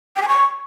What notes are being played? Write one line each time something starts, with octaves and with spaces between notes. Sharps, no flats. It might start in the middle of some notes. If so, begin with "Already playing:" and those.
G5
G#5
C#6